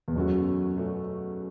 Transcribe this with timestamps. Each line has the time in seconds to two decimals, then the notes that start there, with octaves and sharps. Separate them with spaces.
0.08 E2
0.16 F#2 B2 A3 C#4 F#4
0.76 B2 A3 C#4 F#4